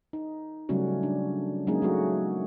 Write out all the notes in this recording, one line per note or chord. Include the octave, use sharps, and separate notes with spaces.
D#4
C#3 F#3 G3 A3 C#4 F#4
D4
F#3 G#3 A#3 C#4 D#4 G#4
F#3 A3 F#4